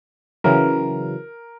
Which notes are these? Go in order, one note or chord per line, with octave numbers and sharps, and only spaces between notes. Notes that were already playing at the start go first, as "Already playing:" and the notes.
C#3 E3 F#3 A#4